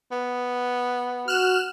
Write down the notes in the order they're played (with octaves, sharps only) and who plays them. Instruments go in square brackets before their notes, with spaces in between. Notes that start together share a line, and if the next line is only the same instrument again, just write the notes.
[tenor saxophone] B3
[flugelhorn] F#4 [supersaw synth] F6 F#6 E7